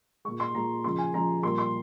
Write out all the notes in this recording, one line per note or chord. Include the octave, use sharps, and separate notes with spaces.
A#2 G#3 C#6
C6
A#2 G#3 A#5
C#3 F3 G#3 C6
G#5
C#3 F3 G#3 A#5
A#2 G3 A#3 C6
C6